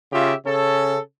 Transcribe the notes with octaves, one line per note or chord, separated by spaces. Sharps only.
C#3 F4 G4 E5
C#3 C#4 A4